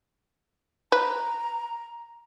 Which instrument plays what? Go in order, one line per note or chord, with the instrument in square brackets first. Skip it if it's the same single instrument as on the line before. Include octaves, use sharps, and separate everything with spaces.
[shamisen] B4 [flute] A#5